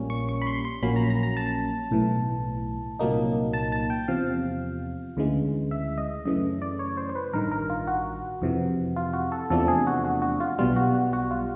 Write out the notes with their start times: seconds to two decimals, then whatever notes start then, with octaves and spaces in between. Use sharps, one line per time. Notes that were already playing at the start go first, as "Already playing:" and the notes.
Already playing: A#1 A#2 G3 A#3 C#4
0.10 C#6
0.29 C#6
0.42 B5
0.47 C6
0.65 C6
0.82 A#1 A#2 F#3 A#3 C#4 B5
0.96 A#5
1.10 A#5
1.23 A#5
1.37 A5
1.91 B1 A2 E3
2.99 C2 A#2 F#3 A#3 D#4
3.53 A5
3.72 A5
3.90 G5
4.08 E2 C3 F3 F5
5.17 D2 C#3 E3 G#3
5.71 E5
5.98 D#5
6.25 F#2 C#3 E3 A3 D#5
6.62 D5
6.79 C#5
6.97 C5
7.09 C5
7.15 B4
7.33 A1 G2 D#3 A#4
7.51 A#4
7.70 F4
7.87 F#4
8.42 F2 C3 E3
8.96 F4
9.13 F#4
9.32 A4
9.50 E2 C3 F3 A3 D4 A4
9.68 G#4
9.87 F#4
10.05 F#4
10.22 F#4
10.40 F4
10.59 B1 B2 G3 F4
10.76 F#4
10.95 F#4
11.13 F#4
11.31 F4